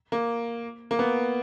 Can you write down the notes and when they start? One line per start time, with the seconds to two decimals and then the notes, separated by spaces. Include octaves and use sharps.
0.12 A#3
0.91 A#3
0.99 B3